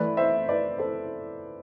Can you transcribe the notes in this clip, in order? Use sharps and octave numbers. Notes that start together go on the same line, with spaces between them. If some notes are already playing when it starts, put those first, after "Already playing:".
Already playing: E3 A3 E4 B4 D5
C5 E5
B4 D5
A4 C5